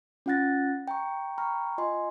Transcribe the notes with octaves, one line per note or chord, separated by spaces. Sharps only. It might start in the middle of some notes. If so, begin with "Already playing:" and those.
C#4 F4 F#5 F#6 A6 A#6
G5 A#5 C#6
G5 A#5 B5 C#6 F6
F4 D#5 G#5 C6